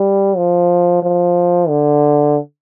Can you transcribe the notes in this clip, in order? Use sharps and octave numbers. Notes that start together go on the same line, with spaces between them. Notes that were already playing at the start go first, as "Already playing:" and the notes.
Already playing: G3
F3
F3
D3